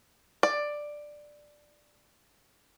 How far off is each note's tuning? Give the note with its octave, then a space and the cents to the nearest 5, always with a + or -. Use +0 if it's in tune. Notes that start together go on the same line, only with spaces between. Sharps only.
D5 +10